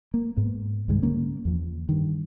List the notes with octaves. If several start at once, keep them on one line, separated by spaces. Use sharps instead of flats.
A#3
G#2 B3
C2 G2 D#3 G#3
D3 G3 A#3 C#4
E2 F3
G2 D#3